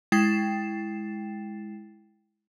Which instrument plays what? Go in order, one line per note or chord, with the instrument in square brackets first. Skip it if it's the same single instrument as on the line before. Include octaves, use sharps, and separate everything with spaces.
[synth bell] G#3 E4 G5 A6 C7 E7